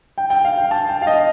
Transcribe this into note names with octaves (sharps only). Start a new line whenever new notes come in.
G5
G5
F5
G5
A5
G5
F5
D#5